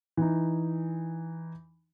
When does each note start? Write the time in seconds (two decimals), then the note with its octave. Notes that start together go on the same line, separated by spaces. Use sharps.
0.17 E3 D#4